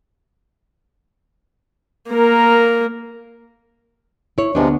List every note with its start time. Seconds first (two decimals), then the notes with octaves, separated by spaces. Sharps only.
2.11 A#3 A#4
4.38 E4 C#5
4.55 D2 C3 F3 G#3 B3 D4